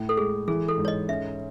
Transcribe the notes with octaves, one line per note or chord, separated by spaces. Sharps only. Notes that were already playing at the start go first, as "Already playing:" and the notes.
Already playing: A2
A4
G#3 G#4
E3 G#4
A4
G#2
C#5
D#5
C#4 E5